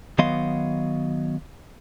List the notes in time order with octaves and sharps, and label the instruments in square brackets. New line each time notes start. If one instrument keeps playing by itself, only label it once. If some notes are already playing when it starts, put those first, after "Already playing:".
[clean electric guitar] D#3 F#3 B3 D#5 F5 C6